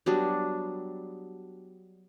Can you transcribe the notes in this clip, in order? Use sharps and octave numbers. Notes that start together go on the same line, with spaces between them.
F#3 G3 B3 D4